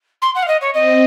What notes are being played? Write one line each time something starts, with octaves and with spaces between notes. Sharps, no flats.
C6
F#5
F5
D#5
C#5
C4 D#5